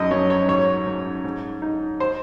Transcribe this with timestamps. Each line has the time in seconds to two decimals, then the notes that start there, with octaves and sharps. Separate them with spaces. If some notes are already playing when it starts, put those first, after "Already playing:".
Already playing: A#1 F#2 D#5
0.11 F#2 C#5
0.30 C#5
0.48 G#2 C#5
0.87 G#2
1.25 G#2
1.62 D#4
2.00 C5